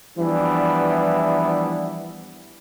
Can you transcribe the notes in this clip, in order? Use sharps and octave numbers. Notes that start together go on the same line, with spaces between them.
E3 F3 G3 B3 D4 E4